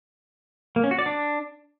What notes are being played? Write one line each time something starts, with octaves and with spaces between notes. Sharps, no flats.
A#3
C#4
F#4
D5
D4